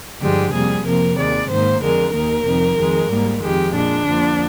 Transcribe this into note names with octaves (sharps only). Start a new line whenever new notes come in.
G2 D3 F3 G#3 G4
F2 C3 G3 A#3 G#4
F2 C3 F3 A#3 A#4
D#2 D#3 G#3 D5
G#2 D#3 A#3 C5
F2 D3 G#3 A#4
D#2 D#3 A#3 A#4
F2 C3 D#3
F2 D#3 G#3
G#2 G3 A#3
F2 D#3 G#3 G4
A#2 G#3 D4
F2 D3 F3 A#3